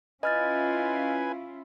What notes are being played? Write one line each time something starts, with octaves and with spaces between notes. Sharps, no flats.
C#4 E4 F4 B4 D#5 G#5 F6 A6